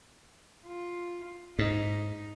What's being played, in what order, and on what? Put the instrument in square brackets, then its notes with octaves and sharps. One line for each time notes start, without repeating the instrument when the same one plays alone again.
[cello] F4
[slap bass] G#2 [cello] D#4